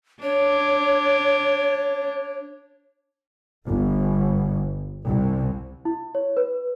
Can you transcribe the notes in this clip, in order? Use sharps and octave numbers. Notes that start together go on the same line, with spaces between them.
D4 C#5
G1
C2
E4
C#5
B4